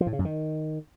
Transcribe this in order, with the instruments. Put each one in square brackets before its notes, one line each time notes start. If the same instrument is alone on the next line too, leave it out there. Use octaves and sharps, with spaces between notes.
[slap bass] F3
A2
C#3
F#2
D#3